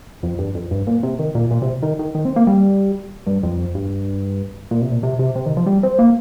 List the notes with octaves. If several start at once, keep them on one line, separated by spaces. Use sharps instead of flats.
F2
G2
F2
G2
A#2
C3
D#3
A#2
A#2
C3
D#3
D#3
D#3
C4
A#3
G3
G2
F2
G2
A#2
C3
A#2
C3
C3
C3
D#3
F3
G3
C4
A#3